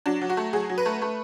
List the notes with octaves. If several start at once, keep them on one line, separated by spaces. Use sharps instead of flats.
F#3 D4
F#3
F#4
A3
F#3 G#4
F#3
B4
A3
A3